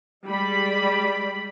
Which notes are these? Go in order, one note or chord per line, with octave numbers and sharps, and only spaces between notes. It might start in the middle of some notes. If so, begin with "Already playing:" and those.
G3 G#3 D5 B5